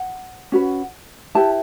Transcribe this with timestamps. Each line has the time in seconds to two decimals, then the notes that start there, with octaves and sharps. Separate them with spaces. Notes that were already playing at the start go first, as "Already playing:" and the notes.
Already playing: F#5
0.52 C#4 F#4 B4
1.35 E4 G4 B4 A5